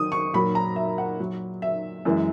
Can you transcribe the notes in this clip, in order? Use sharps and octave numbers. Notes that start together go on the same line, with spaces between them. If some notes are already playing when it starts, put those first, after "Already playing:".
Already playing: D#3 F#3 D#6
C#6
A#2 F#3 B5
A#5
E5
F#5
A#2 F#3
E5
F#2 E3 G#3